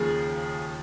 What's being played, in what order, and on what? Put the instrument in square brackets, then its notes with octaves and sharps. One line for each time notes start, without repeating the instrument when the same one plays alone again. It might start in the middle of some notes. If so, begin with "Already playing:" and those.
Already playing: [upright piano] D#2 C#3 F3 A#3 G#4